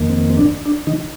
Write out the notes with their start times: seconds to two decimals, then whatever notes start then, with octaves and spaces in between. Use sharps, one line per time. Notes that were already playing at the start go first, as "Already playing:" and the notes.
Already playing: F2 D#3 A#3
0.10 C4
0.30 C4
0.37 D4
0.65 D4
0.87 D#3 D#4